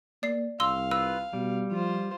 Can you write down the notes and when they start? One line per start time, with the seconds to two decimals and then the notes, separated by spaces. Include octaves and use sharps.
0.23 A#3 D5 C7
0.60 C2 F5 C6 E6
0.91 F4 B4 E6
1.33 B2 G3
1.71 F3 F4 C5